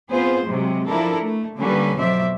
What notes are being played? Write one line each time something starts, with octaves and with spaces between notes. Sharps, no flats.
B3 C4 F4 G#4 C5
C3 F#3 G#3
F3 D4 E4 A4 A#4
A3
D3 G3 A#3 C#4 A4 B4
F2 B2 F#3 C5 D5 E5